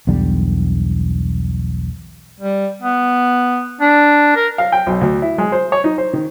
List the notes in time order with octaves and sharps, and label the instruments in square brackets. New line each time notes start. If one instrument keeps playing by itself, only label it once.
[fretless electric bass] B1 E2 D3 G3
[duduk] G3
B3
D4
A#4
[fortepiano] F5
G5
B1
D2
E4
G#3
C5
C#5
D#4
C5
D#3